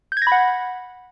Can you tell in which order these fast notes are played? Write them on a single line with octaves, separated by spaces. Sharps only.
G6 G#6 A#6 B5 F#5